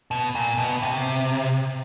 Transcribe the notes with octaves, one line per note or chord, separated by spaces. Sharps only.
B2
A#2
B2
C3